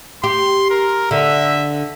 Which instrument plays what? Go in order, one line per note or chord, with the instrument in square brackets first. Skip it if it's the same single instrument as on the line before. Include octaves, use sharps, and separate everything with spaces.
[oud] G4 [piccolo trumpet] C6
[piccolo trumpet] A#4
[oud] D3 [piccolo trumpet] E5